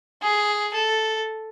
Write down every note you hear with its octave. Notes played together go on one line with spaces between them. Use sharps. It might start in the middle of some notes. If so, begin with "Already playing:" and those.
G#4
A4